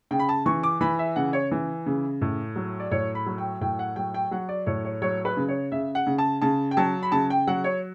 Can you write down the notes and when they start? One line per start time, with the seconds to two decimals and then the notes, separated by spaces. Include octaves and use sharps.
0.11 C#3 G5
0.19 B5
0.29 A5
0.46 E3 C#6
0.63 D6
0.81 E3 B5
0.99 E5
1.16 C#3 F#5
1.33 C#5
1.52 E3
1.86 C#3
2.22 A2
2.56 F#3
2.80 D5
2.91 A2 C#5
3.15 B5
3.26 F#3
3.38 G5
3.61 A2 G5
3.79 F#5
3.96 F#3 G5
4.14 G5
4.31 F#3 F#5
4.49 D5
4.66 A2 C#5
4.85 C#5
5.02 F#3 C#5
5.25 B4
5.37 C#3
5.48 C#5
5.72 C#3 E5
5.95 F#5
6.07 C#3
6.18 A5
6.42 C#3 A5
6.71 G5
6.77 F#3 A5
7.03 B5
7.12 C#3 A5
7.30 G5
7.47 F#3 F#5
7.64 C#5